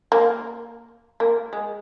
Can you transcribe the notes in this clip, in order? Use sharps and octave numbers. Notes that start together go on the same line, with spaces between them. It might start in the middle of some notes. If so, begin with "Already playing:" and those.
A#3
A#3
G#3